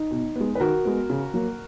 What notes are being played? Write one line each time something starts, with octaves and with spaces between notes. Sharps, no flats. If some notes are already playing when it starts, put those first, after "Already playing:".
Already playing: D#4
B2
G#3 B3
B4
D#3 F#4 A#4
G#3 B3
C#3
F#3 A#3